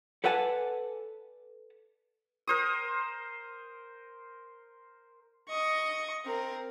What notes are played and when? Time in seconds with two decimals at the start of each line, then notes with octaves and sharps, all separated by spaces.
0.24 A4 B4 D5 F#5 G#5 A5
2.47 A#4 C5 D#6
5.49 D#5 C#6
6.26 C4 A#4